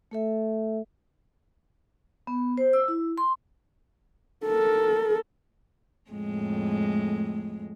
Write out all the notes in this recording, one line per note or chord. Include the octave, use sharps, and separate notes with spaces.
A3 A4 E5
B3
C5
E6
E4
C6
A4 A#4
F2 A2 G#3